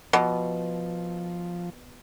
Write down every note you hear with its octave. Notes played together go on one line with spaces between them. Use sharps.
B2 F3